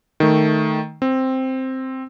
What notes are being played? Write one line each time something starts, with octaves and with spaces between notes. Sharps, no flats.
D#3 A3
C4